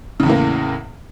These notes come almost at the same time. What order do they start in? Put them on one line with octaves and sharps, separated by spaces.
C#3 E2 A2 A#3